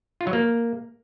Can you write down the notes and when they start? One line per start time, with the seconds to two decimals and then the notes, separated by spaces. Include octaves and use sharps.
0.21 F4
0.27 F#3
0.33 A#3